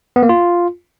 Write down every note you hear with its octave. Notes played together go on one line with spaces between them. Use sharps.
B3
A#3
F4